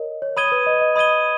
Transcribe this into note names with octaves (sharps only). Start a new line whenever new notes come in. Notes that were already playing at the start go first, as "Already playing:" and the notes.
Already playing: A#4 C#5 D#5
C#5
C#5 B5 D#6 G#6 D#7 G7
B4
D#5
D#5
D#5 B5 D#6 G#6 D#7 G7